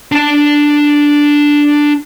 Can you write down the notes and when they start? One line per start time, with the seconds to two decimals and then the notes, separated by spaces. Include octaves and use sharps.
0.12 D4 A5